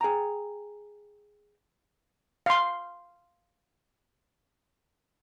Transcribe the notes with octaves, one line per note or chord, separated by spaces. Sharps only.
G#4 G5 A#5
F5 C6